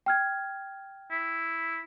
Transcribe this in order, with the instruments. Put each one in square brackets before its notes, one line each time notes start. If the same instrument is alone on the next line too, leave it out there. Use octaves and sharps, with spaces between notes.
[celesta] G5 F6 G#6
[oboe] E4